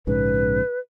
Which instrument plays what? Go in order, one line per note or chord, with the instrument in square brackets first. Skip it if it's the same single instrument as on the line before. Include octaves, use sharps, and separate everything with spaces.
[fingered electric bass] A#1 G#2 C#3 [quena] B4